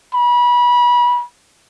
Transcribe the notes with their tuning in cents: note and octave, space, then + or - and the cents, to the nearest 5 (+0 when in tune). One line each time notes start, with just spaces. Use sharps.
B5 -30